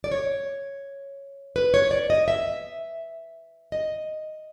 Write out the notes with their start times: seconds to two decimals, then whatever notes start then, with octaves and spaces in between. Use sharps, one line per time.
0.04 D5
0.12 C#5
1.56 B4
1.74 C#5
1.91 D5
2.10 D#5
2.28 E5
3.72 D#5